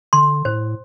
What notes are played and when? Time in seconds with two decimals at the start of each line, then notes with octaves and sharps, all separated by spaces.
0.13 D3 C6
0.45 A2 C5